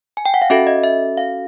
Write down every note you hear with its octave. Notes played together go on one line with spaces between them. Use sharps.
G#5
G5
F#5
F5
C#4 F#4 A4 E5
D#5
E5
F5